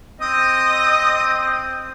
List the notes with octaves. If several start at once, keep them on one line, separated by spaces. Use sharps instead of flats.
C4 D#5 D#6